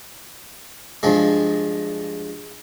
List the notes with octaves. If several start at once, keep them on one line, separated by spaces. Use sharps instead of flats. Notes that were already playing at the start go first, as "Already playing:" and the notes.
G2 F3 G#3